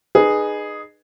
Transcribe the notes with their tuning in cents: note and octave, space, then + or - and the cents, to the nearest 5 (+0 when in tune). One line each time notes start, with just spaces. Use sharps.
D#4 -30 G#4 +0 B4 -10